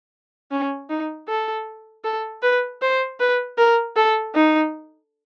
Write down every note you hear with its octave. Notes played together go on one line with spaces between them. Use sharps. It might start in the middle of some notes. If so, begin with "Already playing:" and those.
C#4
D#4
A4
A4
B4
C5
B4
A#4
A4
D#4